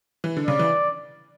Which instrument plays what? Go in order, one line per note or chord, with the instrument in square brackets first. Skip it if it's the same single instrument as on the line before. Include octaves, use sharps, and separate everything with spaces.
[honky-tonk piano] E3
D3
[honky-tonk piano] C#3 [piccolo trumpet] D5
[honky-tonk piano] E3